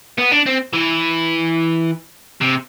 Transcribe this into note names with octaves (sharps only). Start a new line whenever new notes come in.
B3
D4
C4
E3
C3